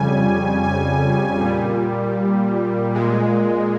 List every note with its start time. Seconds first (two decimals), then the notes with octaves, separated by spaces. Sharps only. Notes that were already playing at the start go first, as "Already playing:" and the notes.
Already playing: F2 C#3 G3 G#5
0.64 G#5
1.41 A#2 G3
2.94 A#2 G#3